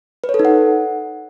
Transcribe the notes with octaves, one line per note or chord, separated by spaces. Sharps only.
B4
C#5
A4
D#4
F#5